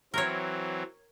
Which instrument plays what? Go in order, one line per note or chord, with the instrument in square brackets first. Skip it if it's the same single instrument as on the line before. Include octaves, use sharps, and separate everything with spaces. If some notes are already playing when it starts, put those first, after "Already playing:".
[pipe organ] E3 F#3 C4 [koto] A#4 C#5